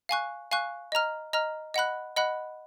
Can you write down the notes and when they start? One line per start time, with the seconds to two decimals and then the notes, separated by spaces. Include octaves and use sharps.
0.09 F5 G#5 C#6 F#6
0.51 F5 G#5 C#6 F#6
0.92 D#5 A#5 F6
1.33 D#5 A#5 F6
1.74 D#5 F#5 B5 F#6
2.16 D#5 F#5 B5 F#6